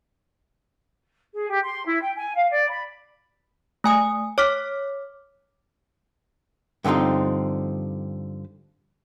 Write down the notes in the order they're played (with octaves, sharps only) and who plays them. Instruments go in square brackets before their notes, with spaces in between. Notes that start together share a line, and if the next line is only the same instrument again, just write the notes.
[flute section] G#4
G4
C6
E4
G5
G#5
F5
D5
B5
[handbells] A3 G#5 D#6
C#5 D6 F6 B6
[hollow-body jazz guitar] G2 D3 F3 C4 D#4